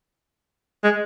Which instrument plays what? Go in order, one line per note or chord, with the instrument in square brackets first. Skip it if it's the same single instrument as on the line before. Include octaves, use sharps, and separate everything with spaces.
[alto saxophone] G#3